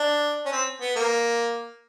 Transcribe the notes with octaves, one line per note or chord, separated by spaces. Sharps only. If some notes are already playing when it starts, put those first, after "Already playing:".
Already playing: D4
C#4
C4
B3
A#3